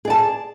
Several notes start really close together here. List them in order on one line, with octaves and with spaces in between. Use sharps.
G#4 D5 A5